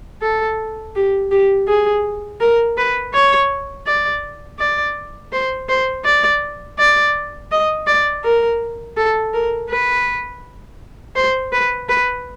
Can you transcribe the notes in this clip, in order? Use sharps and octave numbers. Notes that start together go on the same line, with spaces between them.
A4
G4
G4
G#4
A#4
B4
C#5
D5
D5
C5
C5
D5
D5
D#5
D5
A#4
A4
A#4
B4
C5
B4
B4